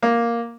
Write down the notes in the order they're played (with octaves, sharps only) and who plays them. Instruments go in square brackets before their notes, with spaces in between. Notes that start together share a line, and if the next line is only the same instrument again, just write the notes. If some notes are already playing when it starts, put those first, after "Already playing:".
[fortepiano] A#3